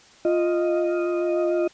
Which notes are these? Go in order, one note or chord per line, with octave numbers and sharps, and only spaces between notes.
F4 D#5